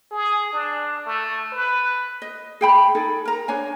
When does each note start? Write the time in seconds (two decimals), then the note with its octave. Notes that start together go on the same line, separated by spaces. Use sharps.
0.11 G#4
0.53 D4
1.06 A3
1.53 B4
2.22 D#5
2.61 G#4 G5 B5
2.95 D#4 G#4 A4
3.25 A#4 A#5
3.48 D4 C#5 G#5